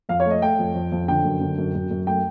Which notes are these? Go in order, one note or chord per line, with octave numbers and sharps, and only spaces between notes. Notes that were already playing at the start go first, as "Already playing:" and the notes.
F2 F5
C#5
A3 D#5
A3 G5
F2
F2
F2
D3 G5
F#2
D3
F#2
F#2
F#2
A3 G5